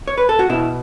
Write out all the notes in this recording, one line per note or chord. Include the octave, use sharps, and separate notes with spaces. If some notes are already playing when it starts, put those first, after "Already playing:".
C#5
B4
A4
F#4
B2 E4